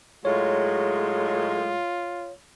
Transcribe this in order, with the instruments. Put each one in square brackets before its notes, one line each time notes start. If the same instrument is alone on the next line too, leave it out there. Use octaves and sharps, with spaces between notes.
[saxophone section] A2 F#3 G#3 [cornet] F4 [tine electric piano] C#5